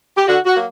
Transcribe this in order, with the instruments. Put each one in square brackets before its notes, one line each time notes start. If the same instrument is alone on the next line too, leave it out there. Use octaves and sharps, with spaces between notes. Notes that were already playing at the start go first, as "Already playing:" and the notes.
[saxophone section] G4
D3 F#4
F#4
F#3 A#3